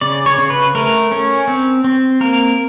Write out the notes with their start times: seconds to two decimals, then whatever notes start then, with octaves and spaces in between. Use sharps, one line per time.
0.01 C#3 D5
0.26 C#5
0.38 C#3
0.50 B4
0.75 A3 A#4
1.11 C#4
1.48 C4
1.84 C4
2.20 A#3 A#4